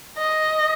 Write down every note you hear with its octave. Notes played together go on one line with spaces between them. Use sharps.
D#5